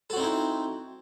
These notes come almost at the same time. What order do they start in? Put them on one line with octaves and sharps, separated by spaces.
A4 F#4 C4 D#4 E4